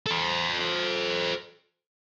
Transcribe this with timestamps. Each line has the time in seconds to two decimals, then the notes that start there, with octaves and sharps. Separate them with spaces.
0.07 A4 C5